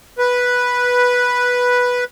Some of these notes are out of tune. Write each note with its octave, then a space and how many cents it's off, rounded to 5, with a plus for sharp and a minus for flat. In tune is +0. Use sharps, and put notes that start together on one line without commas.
B4 -5